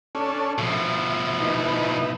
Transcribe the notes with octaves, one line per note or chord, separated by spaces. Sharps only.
C#4 D4 A4
B2 F3 E5
B3 D#4 E4